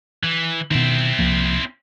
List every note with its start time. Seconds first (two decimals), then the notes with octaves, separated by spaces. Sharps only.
0.24 E3
0.71 B2 D#3 C4 E4
1.19 C2 F3 A#3